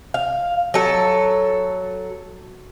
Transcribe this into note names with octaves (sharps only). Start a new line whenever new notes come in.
F5
F#3 A4